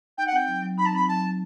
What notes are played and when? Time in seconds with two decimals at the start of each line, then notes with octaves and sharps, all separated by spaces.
0.18 D#4 G5
0.27 F#5
0.32 C4 G5
0.48 F#3
0.62 F#3
0.78 D#4 B5
0.86 A5
0.93 C4 B5
1.08 F#3 A5
1.23 F#3